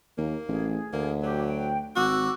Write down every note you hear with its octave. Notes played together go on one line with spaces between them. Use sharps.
D#2 A#3
A1 G#4
D2 A#3
F#3 G4
G5
G#1 F#4 D6 E6